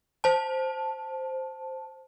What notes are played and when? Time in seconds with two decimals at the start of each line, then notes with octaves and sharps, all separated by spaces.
0.24 C5 A5